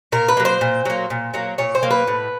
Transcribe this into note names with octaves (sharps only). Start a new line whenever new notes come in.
A#2 A#4
B4
F#3 A#3
C5
A#2
F#3 A#3
A#2
F#3 A#3
A#2 C#5
C5
F#3 A#3
B4
A2